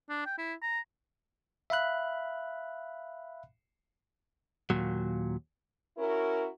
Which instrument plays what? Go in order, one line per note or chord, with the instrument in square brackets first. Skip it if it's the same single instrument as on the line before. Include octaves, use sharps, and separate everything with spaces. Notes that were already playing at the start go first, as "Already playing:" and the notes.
[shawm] D4
G5
E4
A#5
[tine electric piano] E5 F5 B5 F#6
[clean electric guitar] D#2 A#2 F#3
[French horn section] C#4 E4 F#4 A#4